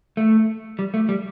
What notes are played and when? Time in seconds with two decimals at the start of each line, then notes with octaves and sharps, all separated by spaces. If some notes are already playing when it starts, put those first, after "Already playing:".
0.17 A3
0.79 G3
0.94 A3
1.09 G3